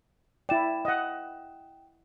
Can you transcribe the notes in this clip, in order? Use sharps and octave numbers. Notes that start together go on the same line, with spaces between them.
E4 D5 G5 E7
D#5 F#5